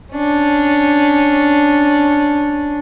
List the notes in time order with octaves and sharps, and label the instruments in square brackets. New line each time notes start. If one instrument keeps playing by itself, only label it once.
[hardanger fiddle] C#4 D4